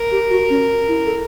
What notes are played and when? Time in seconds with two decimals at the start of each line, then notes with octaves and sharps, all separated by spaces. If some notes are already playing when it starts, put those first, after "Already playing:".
Already playing: A#4
0.11 G4
0.30 F#4
0.50 C#4
0.88 E4
1.06 A4